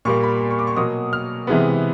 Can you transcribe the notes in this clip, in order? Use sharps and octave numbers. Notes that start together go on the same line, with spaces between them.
A#2 G3 A#3 C#6
B5
C6
C#6
D6
C#6
B2 F#3 A#3 D#6
F6
C3 E3 G#3 B3